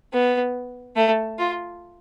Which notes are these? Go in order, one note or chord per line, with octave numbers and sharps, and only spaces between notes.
B3
A3
F4